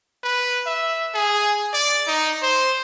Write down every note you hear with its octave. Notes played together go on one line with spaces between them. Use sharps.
B4
E5
G#4
D5
D#4
C5